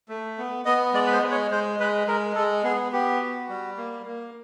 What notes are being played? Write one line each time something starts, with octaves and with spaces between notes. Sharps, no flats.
A3
B3
B3 D#5
G#3 D5
B4
C5
G#3
C#5
G#3 C5
G#3 B4
G#3 A#4
G#3 A4
B3 G#4
B3 G4
F#4
G3
A#3
A#3